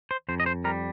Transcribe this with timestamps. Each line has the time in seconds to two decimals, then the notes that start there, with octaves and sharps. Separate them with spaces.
0.11 C5
0.29 F2 C5
0.40 D#5
0.46 C5
0.64 G3 A#4